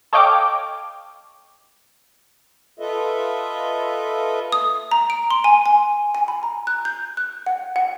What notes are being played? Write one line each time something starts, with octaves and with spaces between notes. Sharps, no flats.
A4 C#5 D#5 F5 G5 D6
F4 A4 B4 D#5 E5
D#6
A#5
D7
C6
G#5
G#5
G#5
B5
A#5
F#6
G6
F#6
F#5
F#5